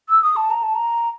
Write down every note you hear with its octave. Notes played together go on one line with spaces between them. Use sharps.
E6
D#6
A5
A#5
A5
A#5